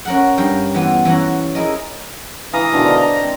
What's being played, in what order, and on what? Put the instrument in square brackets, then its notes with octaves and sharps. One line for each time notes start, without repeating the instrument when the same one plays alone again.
[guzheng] C#4 A#4 F#5
G2 F5 G5 A#5
E3 B3 F4
E3 C#4 F#5 A#5
E4 G#4 A#4 D#5
[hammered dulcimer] E3 D6 [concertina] F5 A#5 D#6
[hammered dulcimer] B2 D3 D#3
C5 D5 D#5
[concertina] A#5
[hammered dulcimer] C4